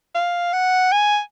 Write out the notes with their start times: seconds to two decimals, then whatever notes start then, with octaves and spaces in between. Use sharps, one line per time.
0.15 F5
0.53 F#5
0.92 G#5